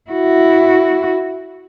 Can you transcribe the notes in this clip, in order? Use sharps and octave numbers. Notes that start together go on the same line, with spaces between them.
E4 F#4